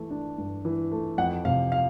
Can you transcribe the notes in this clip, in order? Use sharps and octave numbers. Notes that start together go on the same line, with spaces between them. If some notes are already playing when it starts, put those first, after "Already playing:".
Already playing: E3 A3
D4
G2
E3
A3
F2 F#5
C3 F5
F5